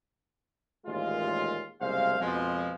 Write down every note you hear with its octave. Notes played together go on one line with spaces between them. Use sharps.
A1 D#2 A#2 G#3 F4
F#1 C2 G#2 G#3 C5 F5
F2 B2 F3 G#3